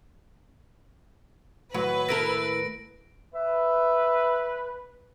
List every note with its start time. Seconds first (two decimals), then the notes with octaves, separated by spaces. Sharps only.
1.74 D#2 A2 F#3 B4
2.09 E4 A4 A#4 A#6 D7
3.35 B4 E5